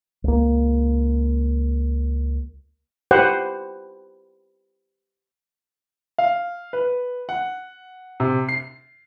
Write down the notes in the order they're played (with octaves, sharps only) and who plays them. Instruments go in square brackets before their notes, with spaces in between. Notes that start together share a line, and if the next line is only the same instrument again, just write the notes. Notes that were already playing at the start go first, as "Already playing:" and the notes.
[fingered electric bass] C#2 A#3
[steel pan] G4 B4 C5 F#5 G5
[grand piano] F5
B4
F#5
C3
C7